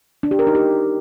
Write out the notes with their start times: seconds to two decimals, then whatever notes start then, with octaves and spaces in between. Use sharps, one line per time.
0.23 D4
0.31 G4
0.39 A#4
0.47 D#4
0.55 G4